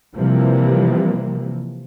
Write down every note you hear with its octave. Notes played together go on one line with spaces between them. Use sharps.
C3 E3 F3 G3 A#3